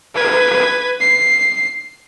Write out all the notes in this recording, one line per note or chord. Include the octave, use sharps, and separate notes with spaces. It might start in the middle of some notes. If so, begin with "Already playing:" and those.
B4 G#6
C7